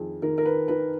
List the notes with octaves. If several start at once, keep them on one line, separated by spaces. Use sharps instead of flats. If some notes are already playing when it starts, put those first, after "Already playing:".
Already playing: F2 D#3 G#4
D#3 A#4
A#4
B4
D#3 B4